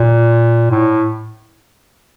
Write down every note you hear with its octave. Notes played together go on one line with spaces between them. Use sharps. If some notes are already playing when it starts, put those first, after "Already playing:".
Already playing: A#2
A2